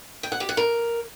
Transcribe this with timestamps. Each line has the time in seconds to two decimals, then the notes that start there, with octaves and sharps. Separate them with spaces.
0.23 G5
0.32 F#5
0.40 G4
0.49 F#5
0.57 A#4